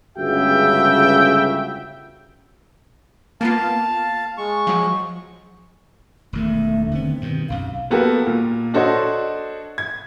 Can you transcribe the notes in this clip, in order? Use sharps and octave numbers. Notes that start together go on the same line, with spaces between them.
G1 C#2 C#3 F#4 E5 G5
A#3 B3 F4 F5 A5
G#3 C#6
F3 F#3
E1 E2 D#3 A3
D3 D#3 B3 C4
G2 B2 D#3
B1 F#2 F5
A#3 B3 F#4 G4 A4 A#4
A#2
D4 F#4 A4 C5 C#5 D#5
G#6